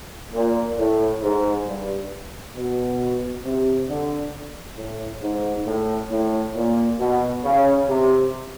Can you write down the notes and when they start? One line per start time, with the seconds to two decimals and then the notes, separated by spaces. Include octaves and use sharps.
0.34 A#2
0.78 A2
1.23 G#2
1.67 G2
2.56 B2
3.44 C3
3.89 D3
4.77 A2
5.22 G#2
5.66 A2
6.11 A2
6.55 A#2
6.99 B2
7.43 C#3
7.88 C3